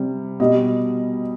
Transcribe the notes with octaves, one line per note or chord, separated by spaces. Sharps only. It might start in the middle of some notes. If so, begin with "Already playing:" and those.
Already playing: C3 G3
B2 G3 D#5